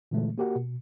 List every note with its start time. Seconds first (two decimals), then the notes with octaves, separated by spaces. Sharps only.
0.11 A#2 D3 E3 G#3 A3
0.38 A#3 F#4 G4 A#4 F#5
0.55 B2